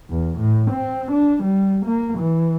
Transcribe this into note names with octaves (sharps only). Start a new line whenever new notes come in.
E2
A2
C4
D4
G3
A#3
E3